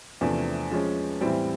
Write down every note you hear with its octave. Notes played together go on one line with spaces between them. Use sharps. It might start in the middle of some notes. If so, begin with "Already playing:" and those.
E2 C3 F3 A3 D4
F3 G#3 C#4
A2 E3 G3 C4